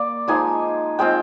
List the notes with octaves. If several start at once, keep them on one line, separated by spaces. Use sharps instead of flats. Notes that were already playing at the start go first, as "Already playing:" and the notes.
Already playing: A#3 D5
F3 G#3 D#4 G#5
G#3 C4 F4 G5